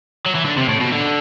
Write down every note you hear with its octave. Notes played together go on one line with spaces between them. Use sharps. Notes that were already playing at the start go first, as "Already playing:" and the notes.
F#3
E3
D3
C3
A2
B2
D3